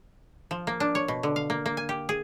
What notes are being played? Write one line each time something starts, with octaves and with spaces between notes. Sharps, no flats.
F3
A#3
D4
C#5
B2
D3
F5
A#3
A#3
G#5
G4
G#4